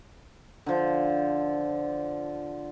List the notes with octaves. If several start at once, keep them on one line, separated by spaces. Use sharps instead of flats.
D3 F3